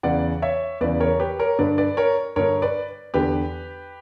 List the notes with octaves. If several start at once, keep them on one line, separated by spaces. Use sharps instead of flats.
E2 C#3 E3 D5 F#5
C#5 E5
E2 C#3 E3 B4 D5
A#4 C#5
G4 B4
A#4 C#5
G2 D3 B4 D5
B4 D5
A#4 C#5
G2 D3 A#4 C#5
B4 D5
E2 D3 G4 B4